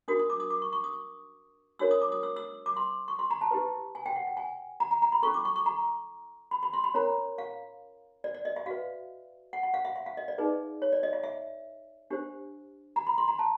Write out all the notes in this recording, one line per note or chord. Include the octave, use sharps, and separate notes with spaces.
D4 F#4 A#4 D#6
D#6
D6
D#6
D6
C#6
C#6
D#6
D4 F#4 A#4 C#5 E6
D#6
D6
D#6
E6
E6
D6
C6
C#6
C6
A#5
A5
E4 G4 B4
G#5
G5
F#5
G5
G#5
A#5
A#5
A#5
B5
C#4 F4 A4 C#6
D6
C#6
C#6
A#5
B5
B5
C6
B5
C#4 F4 A#4 C#5 A#5
F5
D5
D5
D#5
E5
F#4 B4 F5
F#5
F#5
F5
E5
E5
F5
D#5
D5
D#4 G#4 B4
C#5
D5
D#5
E5
E5
D4 G4 C5
A#5
B5
C6
A#5
A5